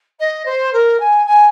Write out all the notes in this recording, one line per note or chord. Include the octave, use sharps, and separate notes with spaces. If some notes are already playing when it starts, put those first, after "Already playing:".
D#5
C5
A#4
G#5
G#5